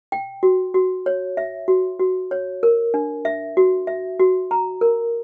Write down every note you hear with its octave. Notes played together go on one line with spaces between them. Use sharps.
G5
F#4
F#4
C#5
E5
F#4
F#4
C#5
A#4
D4
E5
F#4
E5
F#4
A#5
A#4